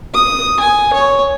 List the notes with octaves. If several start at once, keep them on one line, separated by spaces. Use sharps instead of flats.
D#6
G#5
C#5